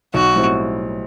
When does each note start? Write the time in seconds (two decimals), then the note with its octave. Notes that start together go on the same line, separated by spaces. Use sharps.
0.14 B1 F#4
0.36 A2 G3 C4 E4